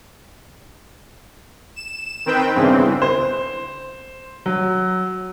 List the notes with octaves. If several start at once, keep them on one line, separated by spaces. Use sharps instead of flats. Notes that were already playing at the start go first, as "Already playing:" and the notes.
E7
D#3 C4 B4 G5
E2 G2 C#3 E3 C4
C5
F#3